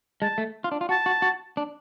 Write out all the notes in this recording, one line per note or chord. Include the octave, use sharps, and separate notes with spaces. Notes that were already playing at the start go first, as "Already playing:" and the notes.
G#3 A5
A3
F4
D4
F4
F#4 A5
F#4
F#4
D4